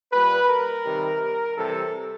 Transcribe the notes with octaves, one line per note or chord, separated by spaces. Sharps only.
A#2 G3 B4
A#4
C3 D#3 G3
C3 E3 G3 A4